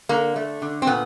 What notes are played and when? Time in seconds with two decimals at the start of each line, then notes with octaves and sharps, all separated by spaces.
0.09 D3 A#3
0.36 A3
0.62 D3
0.82 C4
0.87 A#2 B3